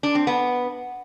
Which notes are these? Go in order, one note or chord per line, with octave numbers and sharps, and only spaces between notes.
D4
C4
B3